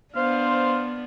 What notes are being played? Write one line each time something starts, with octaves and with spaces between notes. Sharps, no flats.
B3 D4 C5 F5